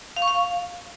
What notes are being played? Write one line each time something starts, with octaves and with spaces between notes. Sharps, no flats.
F5
C#6
F5